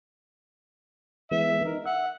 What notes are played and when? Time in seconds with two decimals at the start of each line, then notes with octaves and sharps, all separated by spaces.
1.31 E3 G#3 B3 E5
1.65 D#4 A#4
1.86 E5 F#5